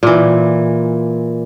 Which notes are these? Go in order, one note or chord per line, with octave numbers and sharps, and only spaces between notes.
A#2 E3